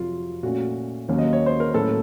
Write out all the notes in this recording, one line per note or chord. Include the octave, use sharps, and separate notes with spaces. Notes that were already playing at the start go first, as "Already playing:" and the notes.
Already playing: F2 C3 F#3 F4
A#2 A3 C#4 F#4
D#2 D#3 F#3 A#3 C#4
D#5
C#5
C5
A#4
A2 F#3 A#3 C#4 A4